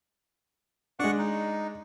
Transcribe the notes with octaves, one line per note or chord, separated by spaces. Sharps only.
G#3 D4 F#5 C#6 F#6
D#4